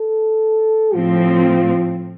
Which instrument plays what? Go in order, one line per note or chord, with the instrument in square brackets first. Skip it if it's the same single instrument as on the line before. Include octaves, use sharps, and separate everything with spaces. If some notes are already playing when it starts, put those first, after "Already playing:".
Already playing: [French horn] A4
[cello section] A2 F3 C4 [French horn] F4